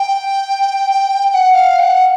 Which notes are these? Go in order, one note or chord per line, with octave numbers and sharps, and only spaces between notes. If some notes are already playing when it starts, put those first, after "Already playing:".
Already playing: G5
G5
F#5
F5
G5
F#5